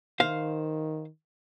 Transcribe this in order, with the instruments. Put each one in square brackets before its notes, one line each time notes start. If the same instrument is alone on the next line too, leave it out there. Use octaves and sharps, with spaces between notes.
[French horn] D#3 [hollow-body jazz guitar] C5 F5